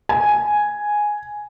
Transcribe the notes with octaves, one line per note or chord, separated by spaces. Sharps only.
G#5